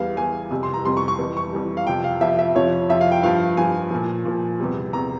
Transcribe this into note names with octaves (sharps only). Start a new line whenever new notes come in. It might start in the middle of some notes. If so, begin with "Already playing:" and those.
Already playing: E2 E3 G3 F5
E2 E3 G3 G#5
F2 C3 G3
C6
A#5
F2 C3 G3 C6
C#6
C#6
F2 E3 G3
C#6
F2 E3 G3
F5
F2 C3 F3 G5
F5
F2 C3 F3 E5
E5
F2 C3 F3 C#5
F2 C3 F3 E5
F5
G5
G2 F3 F5
G2 F3 G#5
A#2 F3
A#2 F3
E2 C3 G3
E2 C3 G3 A#5